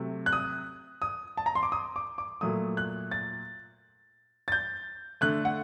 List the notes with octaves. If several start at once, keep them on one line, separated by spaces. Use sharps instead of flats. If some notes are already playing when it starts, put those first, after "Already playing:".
Already playing: C3 F#3 A3
F#6
D#6
D#6
A5
A#5
C6
D6
D#6
D6
D6
A#2 F#3 A3 D#6
F#6
A6
A6
G6
D3 A3 F#6
F#5